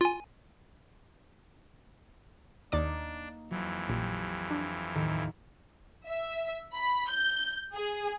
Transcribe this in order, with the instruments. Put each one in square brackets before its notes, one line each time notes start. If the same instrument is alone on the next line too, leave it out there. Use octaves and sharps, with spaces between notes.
[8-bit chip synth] F4 G#5
[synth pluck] D#2 D5 D6 [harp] A#3 D#4 [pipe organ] D4
[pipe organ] F2 E3 [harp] F#3
[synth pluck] A#1 [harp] G4
[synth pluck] D4
[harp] D#2 A2 D#3
[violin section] E5
B5
G6
G#4